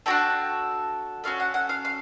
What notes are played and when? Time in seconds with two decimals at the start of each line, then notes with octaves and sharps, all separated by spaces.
0.06 D4 F#4 A4 G5
1.24 C#4 F#4 A4 F5
1.40 F#5
1.54 F#5
1.69 F5
1.85 F5